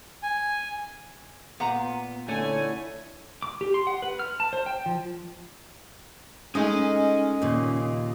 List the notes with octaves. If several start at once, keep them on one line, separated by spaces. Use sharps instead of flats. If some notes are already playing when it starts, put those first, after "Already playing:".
G#5
A#2 B3 F#5 A#5
D3 A3 C#4 E4 C#5 G#5
D6
G4
C6
F#5
B4
F6
A5
C5
G5
F3
G#3 A3 C#4 D#4 D#5 G#5
D#2 A#2 C#3